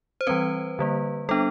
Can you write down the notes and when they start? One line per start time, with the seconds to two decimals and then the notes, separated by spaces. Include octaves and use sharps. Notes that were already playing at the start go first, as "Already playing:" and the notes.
0.21 C5
0.27 E3 G3 C4 B4
0.79 D3 G3 A#3
1.29 G3 B3 D4 A4